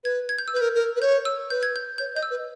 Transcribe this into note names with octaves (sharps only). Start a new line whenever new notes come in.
B4 G#6
G#6
G6
E6
B4
A#4 G6
A#4
B4
C#5 G6
E6
B4 G6
G#6
G6
C#5 G6
D#5 G6
E6
B4